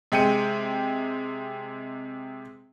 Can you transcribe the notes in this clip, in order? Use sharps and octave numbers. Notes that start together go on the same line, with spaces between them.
C3 G#3 G5 C#7 D#7